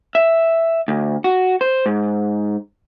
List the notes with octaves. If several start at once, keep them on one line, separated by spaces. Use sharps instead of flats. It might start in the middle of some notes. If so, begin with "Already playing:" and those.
E5
D2
F#4
C5
G#2